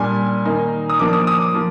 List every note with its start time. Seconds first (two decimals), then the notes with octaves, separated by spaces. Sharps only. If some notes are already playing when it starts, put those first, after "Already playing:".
Already playing: A#2 G3 D4 G#5
0.45 D#3 A#3 D#4
0.90 D#6
0.99 F3 A#3 D4 D6
1.13 D#6
1.27 D#6
1.40 D6
1.54 F3 A#3